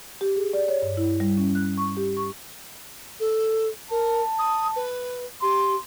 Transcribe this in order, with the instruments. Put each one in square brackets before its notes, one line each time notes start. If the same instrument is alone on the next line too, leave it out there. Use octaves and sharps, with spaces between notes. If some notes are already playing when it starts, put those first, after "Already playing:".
[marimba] G4
G#4
D5
C#5
G2
E4
G3
C#4
F#6
C#6
G4
C#6
[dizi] A4
[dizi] A#4 [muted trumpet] A5
[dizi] D#6
B4
[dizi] G4 [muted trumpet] C6